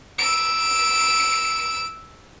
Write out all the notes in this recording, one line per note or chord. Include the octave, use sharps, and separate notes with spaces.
E6 D7